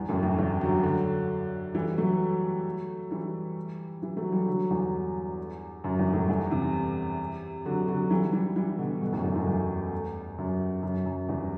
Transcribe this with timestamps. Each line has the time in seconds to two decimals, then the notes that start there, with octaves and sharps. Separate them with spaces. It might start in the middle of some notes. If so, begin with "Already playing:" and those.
Already playing: E2 G2
0.09 F#2 A2
0.23 F#2 A2
0.38 E2 G2
0.61 D3 F#3
0.83 D3 F#3
1.75 E3 G3
1.97 F#3 A3
3.11 E3 G3
4.02 E3 G3
4.17 F#3 A3
4.32 E3 G3
4.47 D3 F#3
4.70 E2 G2
5.84 F#2
5.99 E2 G2
6.13 F#2 A2
6.28 E2 G2
6.51 C3 E3
7.65 D3 F#3
7.88 D3 F#3
8.10 E3 G3
8.33 E3 G3
8.56 E3 G3
8.79 B2 D3
9.01 G2 B2
9.12 F#2 A2
9.24 E2 G2
9.35 F#2 A2
9.47 E2 G2
10.38 F#2
10.83 F#2
11.06 F#2
11.29 E2 G2